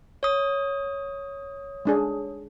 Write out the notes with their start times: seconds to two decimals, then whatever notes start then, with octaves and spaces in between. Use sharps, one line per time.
0.23 C#5 D#6
1.85 G#3 D4 G#4